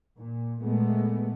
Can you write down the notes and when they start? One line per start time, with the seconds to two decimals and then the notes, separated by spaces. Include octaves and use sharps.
0.17 A#2
0.60 A#2 G#3 A3 B3